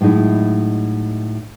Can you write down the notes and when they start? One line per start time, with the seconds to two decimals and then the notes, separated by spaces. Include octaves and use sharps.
0.01 A2 F#3 G#3 D#4 E4